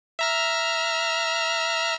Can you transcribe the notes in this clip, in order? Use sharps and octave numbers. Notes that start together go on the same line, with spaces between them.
E5 A#5 F6